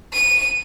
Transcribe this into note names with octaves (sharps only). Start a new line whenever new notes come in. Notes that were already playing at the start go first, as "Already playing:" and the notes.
D#7